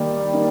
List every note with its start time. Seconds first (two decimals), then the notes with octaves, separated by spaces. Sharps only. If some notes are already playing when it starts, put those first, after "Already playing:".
Already playing: D#3 G3 A#3 D#4
0.33 A#3 D#4